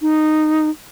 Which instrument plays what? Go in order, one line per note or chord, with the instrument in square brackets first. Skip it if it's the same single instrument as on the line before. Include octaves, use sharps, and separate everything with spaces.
[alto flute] D#4